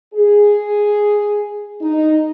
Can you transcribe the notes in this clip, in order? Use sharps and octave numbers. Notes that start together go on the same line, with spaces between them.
G#4
D#4